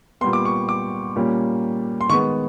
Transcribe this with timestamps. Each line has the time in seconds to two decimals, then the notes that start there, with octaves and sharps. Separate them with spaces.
0.21 B3 C6
0.24 A#2 G3
0.33 D6
0.45 C#6
0.69 D6
1.16 A#2 G3 A#3 C#4
2.01 C6
2.09 D#3 G#3 B3 C#6